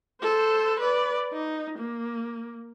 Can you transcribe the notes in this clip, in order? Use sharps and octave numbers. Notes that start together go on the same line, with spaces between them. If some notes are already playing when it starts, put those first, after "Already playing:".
A4 C5
B4 D5
D#4
A#3